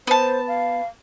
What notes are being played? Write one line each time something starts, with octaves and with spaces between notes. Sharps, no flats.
B3 C5 A5
F5